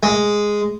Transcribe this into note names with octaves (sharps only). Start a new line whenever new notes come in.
G#3